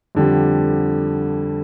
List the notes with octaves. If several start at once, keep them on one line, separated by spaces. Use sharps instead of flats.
F2 D3 G3